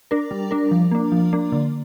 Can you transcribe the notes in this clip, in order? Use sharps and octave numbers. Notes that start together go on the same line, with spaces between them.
D4 A#4
G3
D4 A#4
F3
A#3 D4
F3
A#3 D4
D3